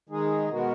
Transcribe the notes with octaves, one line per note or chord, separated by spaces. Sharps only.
D#3 G#3 D#4 G#4
B2 G#3 B3 F#4 A#4